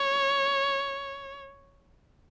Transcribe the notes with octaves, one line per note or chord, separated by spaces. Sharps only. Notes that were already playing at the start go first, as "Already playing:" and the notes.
Already playing: C#5